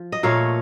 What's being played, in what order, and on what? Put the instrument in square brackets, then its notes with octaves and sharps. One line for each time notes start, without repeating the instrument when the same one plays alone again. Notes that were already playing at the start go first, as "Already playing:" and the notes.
Already playing: [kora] F3
D#5
A#2 A3 C#5 F5